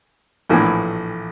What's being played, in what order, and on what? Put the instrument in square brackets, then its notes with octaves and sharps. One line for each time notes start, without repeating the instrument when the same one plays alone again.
[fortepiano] A#1 A2 E3